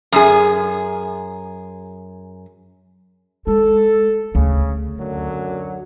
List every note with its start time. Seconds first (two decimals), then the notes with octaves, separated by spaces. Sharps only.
0.12 F#2 G#4
3.47 G#3 A4
4.35 D2 C#3
4.98 F#2 D3 F#3